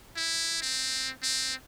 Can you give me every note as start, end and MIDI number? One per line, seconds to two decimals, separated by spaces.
0.17 0.58 64
0.62 1.11 60
1.23 1.54 60